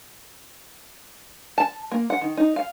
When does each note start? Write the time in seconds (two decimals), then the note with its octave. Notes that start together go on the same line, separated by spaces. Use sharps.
1.58 A5
1.91 A#3
2.10 F#5
2.21 D#3
2.37 D#4
2.56 F5